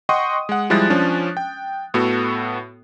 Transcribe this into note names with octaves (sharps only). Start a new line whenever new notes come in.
D#5 F#5 G5 C6 C#6 D#6
G#3 F#5
F3 G3 G#3 E4 F#6 A6
F3 C#4 D4
G5
A2 B3 F#4 A4